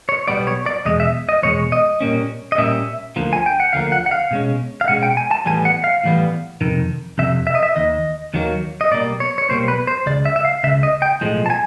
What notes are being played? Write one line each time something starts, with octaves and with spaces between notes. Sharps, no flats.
C#5
B1 B2 G3 B3 D5
C#5
D5
E2 B2 G#3 D#5
E5
D#5
E2 B2 G#3 C#5
D#5
A#2 G3 A#3 C#4
D#5
A#2 G3 A#3 C#4 E5
D2 D3 F3 A#3
G#5
G5
F#5
D2 D3 F3 A#3 F5
F#5
F#5
F5
B2 G#3 C#4
F5
B2 G#3 C#4 F#5
G5
G#5
A5
A2 E3 G3 B3 G#5
F#5
F5
A2 E3 G3 B3
F2 C3 D#3
F2 C3 E5
E5
D#5
E5
D#2 D#3 D#5
D#2 D#3 F#3 A#3
D#5
B1 B2 G3 A#3 D5
C#5
C#5
B1 B2 G3 A#3 C5
B4
C5
C#2 C#3 D5
E5
E5
F5
C#2 C#3 E5
D#5
G5
B1 A2 F3 G#3
A5
G#5